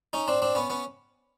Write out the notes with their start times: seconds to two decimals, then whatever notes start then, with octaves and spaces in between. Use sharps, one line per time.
0.13 C#4 D#4
0.28 C4 D4
0.42 C4 D4
0.55 B3 C#4
0.70 B3 C#4